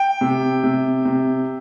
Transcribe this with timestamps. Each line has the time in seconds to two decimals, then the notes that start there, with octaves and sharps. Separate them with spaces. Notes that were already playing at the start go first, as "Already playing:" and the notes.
Already playing: G5
0.21 C3
0.64 C3
1.05 C3